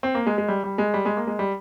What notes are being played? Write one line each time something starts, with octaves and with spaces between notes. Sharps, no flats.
C4
A#3
G#3
G#3
G3
G3
G#3
G3
G#3
A#3
G#3
G3